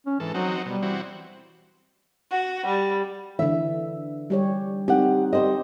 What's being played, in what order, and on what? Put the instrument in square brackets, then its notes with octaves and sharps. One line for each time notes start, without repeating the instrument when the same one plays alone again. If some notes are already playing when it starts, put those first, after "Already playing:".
[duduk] C#4
[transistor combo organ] G#2 A4 [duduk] E3
[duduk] F#3 [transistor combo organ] C4 D#4 F#4
[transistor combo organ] B2 [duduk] G3
[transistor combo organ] E3 C4 F#4
[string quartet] F#4
G3
[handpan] D3 E3 [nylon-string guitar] E5
[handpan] G3 G4 C#5
[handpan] C4 D#4 [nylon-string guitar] G4 F#5
[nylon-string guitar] G3 C5 D#5 [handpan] G4